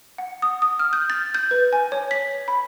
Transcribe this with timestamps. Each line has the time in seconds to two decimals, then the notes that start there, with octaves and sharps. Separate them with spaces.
0.18 F#5
0.42 D#6
0.62 D#6
0.79 F6
0.93 G6
1.10 A6
1.35 G6
1.51 B4
1.73 G#5
1.92 C#5
2.11 B6
2.48 B5